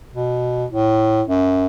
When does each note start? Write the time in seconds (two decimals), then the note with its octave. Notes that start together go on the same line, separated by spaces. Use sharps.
0.13 B2
0.71 A2
1.28 F#2